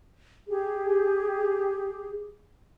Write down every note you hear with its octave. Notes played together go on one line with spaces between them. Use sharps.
G4 G#4